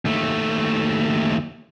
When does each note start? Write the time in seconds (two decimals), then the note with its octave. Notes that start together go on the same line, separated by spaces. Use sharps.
0.05 D#2 A3